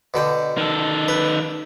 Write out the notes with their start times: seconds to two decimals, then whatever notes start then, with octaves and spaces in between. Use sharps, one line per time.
0.14 B2 D3 G5
0.58 D#3 A4
1.08 B4